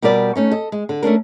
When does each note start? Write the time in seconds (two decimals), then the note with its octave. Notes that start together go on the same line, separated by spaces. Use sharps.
0.02 B2 G3 G4 A#4 D5
0.35 A3 C#4 D#4
0.51 A4 D#5
0.72 G#3
0.89 D3
1.02 A3 C#4 D4 A#4